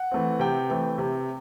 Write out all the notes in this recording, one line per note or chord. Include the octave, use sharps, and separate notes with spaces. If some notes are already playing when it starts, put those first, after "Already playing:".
Already playing: F#5
E3 A3 C4
C3 G5
E3 A3 C4
C3